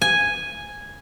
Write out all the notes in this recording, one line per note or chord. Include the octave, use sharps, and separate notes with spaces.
G#5